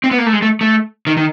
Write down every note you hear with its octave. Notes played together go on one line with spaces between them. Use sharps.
C4
B3
A#3
A3
G#3
A3
A3
D#3
D#3